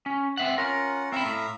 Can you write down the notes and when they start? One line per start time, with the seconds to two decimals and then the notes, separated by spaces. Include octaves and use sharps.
0.06 C#4
0.37 C4 E5 F#5
0.58 C#4 F4 A#4 F#5
1.12 C4 E4 E5 F5 A#5
1.25 A2